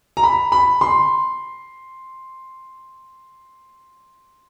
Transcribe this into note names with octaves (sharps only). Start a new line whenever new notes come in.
A#5
B5
B5
C6